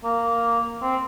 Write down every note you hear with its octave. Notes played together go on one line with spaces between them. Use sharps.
A#3
C4